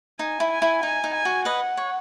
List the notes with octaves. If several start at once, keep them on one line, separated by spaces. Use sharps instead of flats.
D#4 G#5
E4
G#5
E4
D#4 G#5
D#4
G#5
F#4
B4 D#5 F#5
C#5